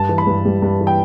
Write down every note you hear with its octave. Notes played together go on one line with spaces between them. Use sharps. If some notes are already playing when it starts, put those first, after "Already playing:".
Already playing: G2 A5
E3
B5
G2
G3
G2
E3
G5